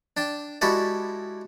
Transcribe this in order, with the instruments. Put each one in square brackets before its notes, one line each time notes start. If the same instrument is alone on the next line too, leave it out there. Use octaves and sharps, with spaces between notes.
[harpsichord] D4 G5 A5
G#3 E4 F#4 G4 A4 D5